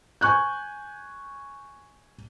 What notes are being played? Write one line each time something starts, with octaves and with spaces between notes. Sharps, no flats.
G#5 C#6 F#6 G6